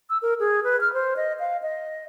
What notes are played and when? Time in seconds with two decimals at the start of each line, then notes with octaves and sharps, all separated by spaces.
0.10 E6
0.22 A#4
0.40 G#4
0.64 B4
0.81 F6
0.93 C5
1.17 D#5
1.40 F5
1.63 D#5